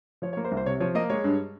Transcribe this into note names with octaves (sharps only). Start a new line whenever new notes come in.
F3 C#5
C#5
A#3
C5
C2
C5
C3 C#5
F3 C#5
A#3 D#5
G#3 C#5
G2